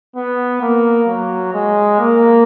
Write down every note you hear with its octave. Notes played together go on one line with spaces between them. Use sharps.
B3
A#3
F#3
G#3
A#3